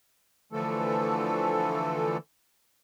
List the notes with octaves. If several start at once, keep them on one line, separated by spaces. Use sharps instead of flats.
D3 E3 F3 A3 A4